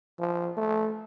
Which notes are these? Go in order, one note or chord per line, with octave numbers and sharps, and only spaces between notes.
F3
A3